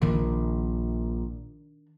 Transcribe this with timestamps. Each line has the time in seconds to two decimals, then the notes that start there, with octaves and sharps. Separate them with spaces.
0.02 A#1 D#3 D4